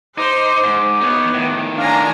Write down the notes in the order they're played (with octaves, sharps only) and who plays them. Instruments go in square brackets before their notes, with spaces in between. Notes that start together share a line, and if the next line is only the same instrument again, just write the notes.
[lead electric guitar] D#4 [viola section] C5 [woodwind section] D6
[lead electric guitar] G#2
[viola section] B3 [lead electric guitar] D#4 C#5
[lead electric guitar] A2 D#3
[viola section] D4 G#5 A#5 [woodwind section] F5